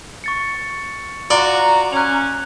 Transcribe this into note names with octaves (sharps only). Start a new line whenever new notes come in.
C#6 A6 C#7
F4 F#4 D5 A#5 G7
C#4 F#6 F7